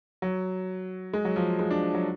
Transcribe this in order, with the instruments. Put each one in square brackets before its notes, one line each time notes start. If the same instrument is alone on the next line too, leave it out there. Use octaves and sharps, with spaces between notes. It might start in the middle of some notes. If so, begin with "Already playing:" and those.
[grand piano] F#3
G#3
F#3
F3
G#3
D4
F#3